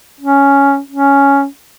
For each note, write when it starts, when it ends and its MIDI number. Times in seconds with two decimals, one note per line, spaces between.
0.21 0.79 61
0.91 1.46 61